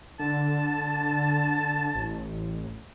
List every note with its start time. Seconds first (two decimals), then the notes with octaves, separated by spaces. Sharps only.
0.20 D3 A5
1.95 A1